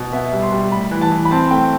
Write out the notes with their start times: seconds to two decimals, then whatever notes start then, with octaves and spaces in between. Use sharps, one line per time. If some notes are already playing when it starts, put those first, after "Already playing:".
Already playing: B2
0.13 B3 E5
0.33 G3
0.42 C6
0.52 G3
0.72 A2 B5
0.91 E3
1.01 A5
1.11 E3
1.25 B5
1.31 C4 A5
1.51 A3 G5